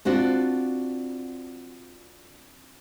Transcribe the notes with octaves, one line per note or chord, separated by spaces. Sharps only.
C4 D4 F4 F#4